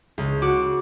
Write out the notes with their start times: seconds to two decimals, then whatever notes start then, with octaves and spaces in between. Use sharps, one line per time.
0.18 C#2
0.42 F#4 D6